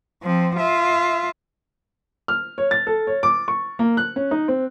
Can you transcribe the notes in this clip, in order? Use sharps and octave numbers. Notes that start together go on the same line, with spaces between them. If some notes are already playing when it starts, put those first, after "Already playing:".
F3 C4
F4 E5
F6
C#5
A6
A4
C#5
D6
C#6
A#3
F#6
C#4
D#4
C4